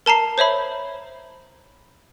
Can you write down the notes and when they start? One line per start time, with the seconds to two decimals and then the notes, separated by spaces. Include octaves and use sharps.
0.06 A#4 A5 A#5 C7
0.38 C5 C#5 E5 B5